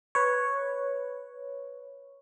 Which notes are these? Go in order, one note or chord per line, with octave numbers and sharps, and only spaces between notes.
B4 C#5